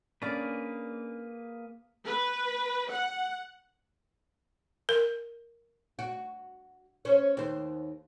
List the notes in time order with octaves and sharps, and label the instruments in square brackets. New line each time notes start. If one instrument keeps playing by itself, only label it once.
[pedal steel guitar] A#3 G#4 B4 [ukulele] C#4 D4 D5
[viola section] B4
F#5
[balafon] A#4
[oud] F#4
C#4 C5
D#2 C5